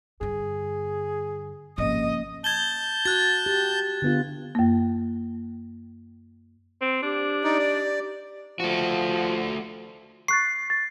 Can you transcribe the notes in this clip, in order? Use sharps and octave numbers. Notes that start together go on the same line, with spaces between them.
G2 D3 G#4
G#1 C3 F3 A#3 C#4 D#5
A5 G6 G#6 G7
F#4 F#6 A6
G4
D3 B3 F4
F#2 A#3
C4
D4 G4
D#4 D5
D5
F3 A3 F#4
C#6 F#6 A6 C7
A6